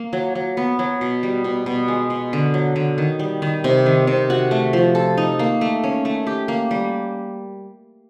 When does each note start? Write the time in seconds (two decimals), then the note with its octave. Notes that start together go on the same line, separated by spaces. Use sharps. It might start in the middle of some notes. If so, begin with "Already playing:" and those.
Already playing: A#3
0.13 F#3
0.35 F#3
0.57 B3
0.79 F#3
1.01 B2
1.23 G3
1.44 B2
1.66 B2
1.88 G#3
2.10 B2
2.33 D3
2.54 F#3
2.76 D3
2.98 D#3
3.19 G3
3.42 D#3
3.64 C3
3.86 D#3
4.07 C3
4.30 F#4
4.51 A3
4.73 F3
4.95 A4
5.17 D#4
5.39 A#3
5.61 A3
5.84 C#4
6.05 A3
6.27 G4
6.48 A#3
6.71 G3